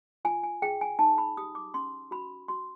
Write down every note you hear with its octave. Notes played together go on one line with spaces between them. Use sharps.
F4 G#5
G#5
G#4 G5
G#5
D#4 A5
B5
G4 D#6
D6
C#4 C6
F#4 B5
F#4 C6